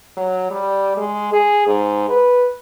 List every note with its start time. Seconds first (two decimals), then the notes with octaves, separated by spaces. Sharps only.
0.17 F#3
0.50 G3
0.97 G#3
1.32 G#4
1.67 G#2
2.09 B4